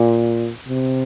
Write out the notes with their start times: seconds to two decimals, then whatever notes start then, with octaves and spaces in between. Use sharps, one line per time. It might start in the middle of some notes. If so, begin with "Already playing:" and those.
Already playing: A#2
0.68 C3